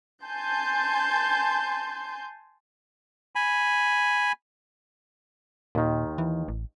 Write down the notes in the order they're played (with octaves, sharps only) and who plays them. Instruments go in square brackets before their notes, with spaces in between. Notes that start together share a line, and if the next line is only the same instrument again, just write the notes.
[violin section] G#5 A5 C6 G6
[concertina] G#5 B5
[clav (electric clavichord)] D#2 D#3 [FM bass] A#2
[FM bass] E3
A1